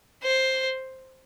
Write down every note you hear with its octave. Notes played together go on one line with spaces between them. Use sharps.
C5